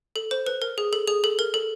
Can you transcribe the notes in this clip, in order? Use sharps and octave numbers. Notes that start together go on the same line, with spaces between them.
A4
C5
B4
A#4
G#4
A4
G#4
A4
A#4
A4